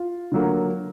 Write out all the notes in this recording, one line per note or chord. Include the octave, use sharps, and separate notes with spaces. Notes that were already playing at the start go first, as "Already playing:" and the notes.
Already playing: F4
D3 F#3 A#3